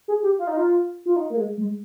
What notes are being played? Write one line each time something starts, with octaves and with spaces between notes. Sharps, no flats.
G#4
G4
F4
D#4
F4
F4
D#4
A#3
G#3
G#3